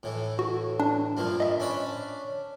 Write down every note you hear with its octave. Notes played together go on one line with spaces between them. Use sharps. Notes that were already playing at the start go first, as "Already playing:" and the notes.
A2 E3
F#4
D4
G2 A#2 F3
D#5 E5
C#4 D4 B5